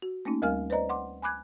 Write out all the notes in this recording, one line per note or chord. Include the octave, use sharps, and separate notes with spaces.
F#4
A3 A#3 C#4 D#4
D2 G3 A#4 F5 G#5 F6
B4 C5 D5 D#5 A#5
F#5 C6 D6
G#5 B5 D6 F#6 G#6